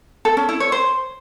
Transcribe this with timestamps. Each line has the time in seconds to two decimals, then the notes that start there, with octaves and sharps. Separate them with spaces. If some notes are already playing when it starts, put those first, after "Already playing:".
0.25 A4
0.37 C#4
0.49 E4
0.60 C#5
0.72 C5